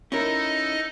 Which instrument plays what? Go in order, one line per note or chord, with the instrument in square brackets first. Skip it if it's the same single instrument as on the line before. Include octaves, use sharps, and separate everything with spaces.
[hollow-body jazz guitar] C#4 E4 A#4 [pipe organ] D#4 A4 D#5